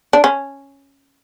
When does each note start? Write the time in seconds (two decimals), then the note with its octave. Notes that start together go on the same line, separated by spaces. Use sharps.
0.13 D4
0.24 C#4